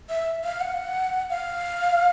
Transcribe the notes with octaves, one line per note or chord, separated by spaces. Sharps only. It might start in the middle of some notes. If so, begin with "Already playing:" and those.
E5
F5
F#5
F5